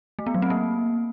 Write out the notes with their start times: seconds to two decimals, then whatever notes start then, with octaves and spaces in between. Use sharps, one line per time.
0.19 A3
0.26 B3
0.34 F#3
0.42 C4
0.50 A#3